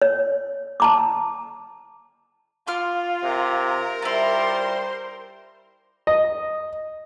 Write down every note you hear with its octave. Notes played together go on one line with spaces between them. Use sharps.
C#5
A5 A#5 D6
F4 C6 D6 F6
C3 A#4
G3 E4 F4 C5 C6
D#5